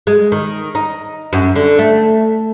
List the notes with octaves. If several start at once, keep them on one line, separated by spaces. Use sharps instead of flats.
G#3
D#3
D#4
F#2
D3
A3